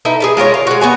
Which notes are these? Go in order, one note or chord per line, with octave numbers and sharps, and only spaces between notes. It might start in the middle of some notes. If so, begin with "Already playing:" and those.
D#4 E4 A4 B4
G#4 A4 B4
G#3 F4 A#4 C#5
F5
G#3 F#4
B3 F#4 G#5